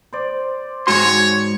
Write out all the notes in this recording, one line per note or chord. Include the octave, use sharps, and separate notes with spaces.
C5 D5
G#2 F#4 C#5 C6